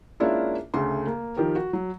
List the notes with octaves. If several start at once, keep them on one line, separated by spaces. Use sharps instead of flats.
G#3 A#3 C#4 D4 E4 F4
D2 C#3 A3 C6
A#3
D#3 F3 G4 A#4
F#4
F#3